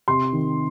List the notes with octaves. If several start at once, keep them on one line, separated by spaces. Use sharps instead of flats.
C3 C6
D#3